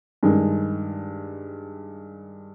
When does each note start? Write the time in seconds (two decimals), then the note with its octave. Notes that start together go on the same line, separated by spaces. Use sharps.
0.23 G2 D#3 G#3